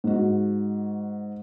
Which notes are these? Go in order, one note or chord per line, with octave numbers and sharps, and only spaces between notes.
G#2 F#4